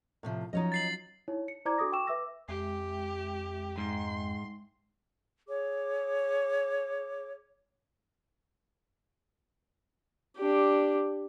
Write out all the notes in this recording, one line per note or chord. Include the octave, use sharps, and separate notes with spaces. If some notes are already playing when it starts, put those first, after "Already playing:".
A2 C3 F3
F3 F#3 C#4 D#4 C#5 D#5
A6 C7 F#7
D#4 E4 C#5
C#7
E4 C5 D5 A#5 D6 G#6
D4 F#4 A4 D6 D#6 A#6
G5 C#6 D6 E6 E7
B4 E5 D6 E6 A#6
F2 G#3 G4 E5 G5
G#2 C6
G#4 C#5 D6
D4 G4